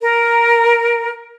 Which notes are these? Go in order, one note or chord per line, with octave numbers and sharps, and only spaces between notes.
A#4